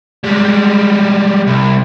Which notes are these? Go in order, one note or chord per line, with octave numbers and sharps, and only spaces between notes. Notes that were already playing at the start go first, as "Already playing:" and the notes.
G3 G#3
C2